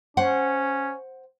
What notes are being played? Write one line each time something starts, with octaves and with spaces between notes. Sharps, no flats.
C#4 C5 F#5